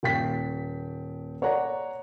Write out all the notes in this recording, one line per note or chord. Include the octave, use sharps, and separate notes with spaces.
D#1 G5 B6
C#5 D5 F#5 A#5